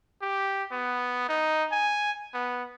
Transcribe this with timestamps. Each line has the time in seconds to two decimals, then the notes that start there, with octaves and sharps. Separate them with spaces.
0.22 G4
0.71 B3
1.29 D#4
1.72 G#5
2.34 B3